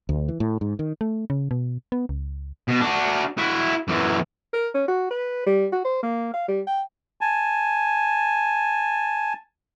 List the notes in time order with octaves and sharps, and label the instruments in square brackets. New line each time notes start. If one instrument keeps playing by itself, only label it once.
[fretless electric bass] D2
E3
A2
G#2
D#3
[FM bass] A3
C#3
B2
B3
C#2
[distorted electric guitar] B2
D4 F#4
E4 F#4
F#2 E3
[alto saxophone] A#4
C#4
F#4
B4
G3
F#4
C5
A#3
F5
G3
G5
[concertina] G#5 A5